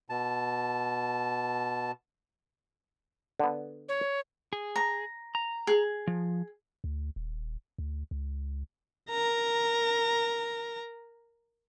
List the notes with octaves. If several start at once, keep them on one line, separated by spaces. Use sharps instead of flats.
B2 A5
D3 B3
C#5
G#4
A#5
A#5
G#4
F3
D2
D#1
D2
C#2
A#4 A#5